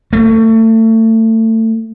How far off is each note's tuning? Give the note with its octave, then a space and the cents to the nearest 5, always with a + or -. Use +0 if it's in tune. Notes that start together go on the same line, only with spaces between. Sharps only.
A3 +30